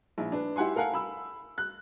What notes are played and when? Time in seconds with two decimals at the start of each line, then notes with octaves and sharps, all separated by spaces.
0.18 A#1 E4
0.32 D4 B4
0.56 E4 G4 F#5 G#5 C6
0.75 A4 A#4 F5 F#5 G#5
0.94 B5 E6
1.58 F#6